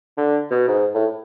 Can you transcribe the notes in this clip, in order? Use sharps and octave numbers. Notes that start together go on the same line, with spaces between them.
D3
B2
G#2
A2